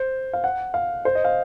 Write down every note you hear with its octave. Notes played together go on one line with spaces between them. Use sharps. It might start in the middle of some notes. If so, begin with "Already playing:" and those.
Already playing: C5
F5
F#5
F5
C5
D#5
F5